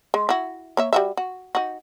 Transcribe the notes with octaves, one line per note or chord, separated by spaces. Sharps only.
G#3
E4 F#4
A#3 C#5 E5
G3 F#4 E5
F#4
D#4 F#4